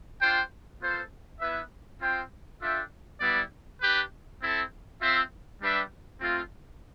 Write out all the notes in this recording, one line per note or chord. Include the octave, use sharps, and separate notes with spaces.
D4 F4 C5 G5
B3 F4 A4 C5
B3 E4 B4 E5
C4 F4 C5 G5
D4 F4 A4 E5 G5
G3 B3 E4 B4 D5
D4 G4 B4
C4 E4 A4
C4 F4 C5 E5
G3 D4 G4 B4 E5
A3 C4 F4